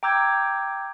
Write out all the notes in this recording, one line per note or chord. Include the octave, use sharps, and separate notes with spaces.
G5 A#5 D6 E6 G6 G#6